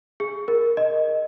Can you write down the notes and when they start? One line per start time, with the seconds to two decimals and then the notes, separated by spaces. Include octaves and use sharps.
0.20 G#4
0.48 A#4
0.77 D#5